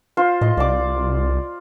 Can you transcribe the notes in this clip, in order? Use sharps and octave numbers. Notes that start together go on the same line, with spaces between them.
F4 C5
A2 D#5
C2 D5 D6